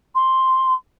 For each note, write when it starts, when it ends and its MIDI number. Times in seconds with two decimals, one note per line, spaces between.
0.15 0.74 84